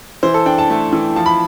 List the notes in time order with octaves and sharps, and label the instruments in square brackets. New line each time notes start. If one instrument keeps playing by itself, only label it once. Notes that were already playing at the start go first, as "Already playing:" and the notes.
[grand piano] E3 C5
A4
D4 G5
A5
A3
E3
F3 A5
B5